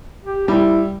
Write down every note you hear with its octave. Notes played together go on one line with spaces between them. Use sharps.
G4
G3 E4